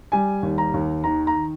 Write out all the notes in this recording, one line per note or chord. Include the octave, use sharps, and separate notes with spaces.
G3 G#5
D#2
A#5
D#2
D#3 A#5
A#5